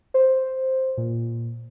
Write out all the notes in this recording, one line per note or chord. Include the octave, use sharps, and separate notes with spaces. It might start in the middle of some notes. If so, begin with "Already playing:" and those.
C5
A#2